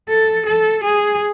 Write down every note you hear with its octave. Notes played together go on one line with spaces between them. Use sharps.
A4
A4
G#4